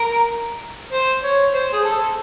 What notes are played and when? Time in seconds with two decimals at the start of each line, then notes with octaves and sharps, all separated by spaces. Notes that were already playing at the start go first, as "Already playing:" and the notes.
Already playing: A#4
0.92 C5
1.23 C#5
1.53 C5
1.72 G#4
1.84 A4